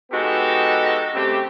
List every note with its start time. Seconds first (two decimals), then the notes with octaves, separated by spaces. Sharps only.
0.12 G#3 B3 D#4 F#4 G4 A4
1.15 C#3 A3 C4 G4